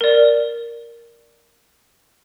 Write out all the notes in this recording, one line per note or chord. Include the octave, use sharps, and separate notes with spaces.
A#4 D5